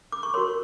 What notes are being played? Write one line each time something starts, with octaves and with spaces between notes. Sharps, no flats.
D6
C#6
F#4 A#4 C#5 C6